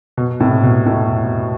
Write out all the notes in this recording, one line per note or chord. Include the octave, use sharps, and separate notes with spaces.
B2
A2 C3
B2
A2